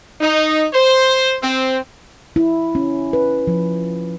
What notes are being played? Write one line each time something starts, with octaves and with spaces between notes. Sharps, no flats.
D#4
C5
C4
E4
C#4
B4
F3